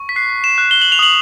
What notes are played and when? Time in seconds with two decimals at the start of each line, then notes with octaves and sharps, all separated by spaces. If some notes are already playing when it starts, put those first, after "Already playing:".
Already playing: C#6
0.09 B6
0.16 F#6 C7
0.44 E7
0.58 F#6
0.71 G7
0.82 F#7
0.92 F7
0.99 D#6 F#7